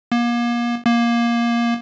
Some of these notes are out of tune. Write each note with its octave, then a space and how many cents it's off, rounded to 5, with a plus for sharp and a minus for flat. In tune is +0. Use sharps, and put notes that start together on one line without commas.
A#3 +35
A#3 +15